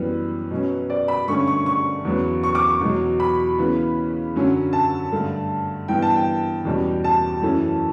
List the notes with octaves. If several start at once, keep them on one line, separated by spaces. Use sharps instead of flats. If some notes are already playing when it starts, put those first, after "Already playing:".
Already playing: F#2 E3 G3 B3 B4
B2 F#3 C#4
D5
B5
G2 D3 A3 C#4 C#6
C#6
C#6
E2 C#3 F#3 B3
C#6
D6
C#6
E2 B2 F#3
B5
C#3 E3 B3
F#2 D3 F#3 C#4
A5
G2 D3 A3
G2 E3 B3 G5
A5
G5
E2 B2 G3 C#4
A5
F#2 E3 A3 C#4